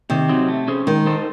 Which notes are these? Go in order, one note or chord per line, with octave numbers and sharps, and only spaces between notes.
C3 D#3
F#3 C4 D#4
A3
C#4 G#4 C5
D#3 G#3
D#4 A4 C5